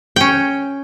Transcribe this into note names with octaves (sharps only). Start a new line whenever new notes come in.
C#4 G5